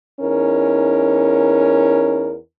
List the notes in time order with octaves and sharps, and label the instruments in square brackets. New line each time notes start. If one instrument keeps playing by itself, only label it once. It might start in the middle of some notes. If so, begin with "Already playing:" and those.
[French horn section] E2 C#4 D#4 A#4